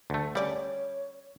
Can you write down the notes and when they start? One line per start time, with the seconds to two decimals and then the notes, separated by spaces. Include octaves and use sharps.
0.10 D2 A3
0.35 G3 C#4 C#5 D5 F#5